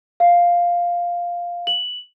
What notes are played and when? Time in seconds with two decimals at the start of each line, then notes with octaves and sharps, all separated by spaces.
0.20 F5
1.67 F#7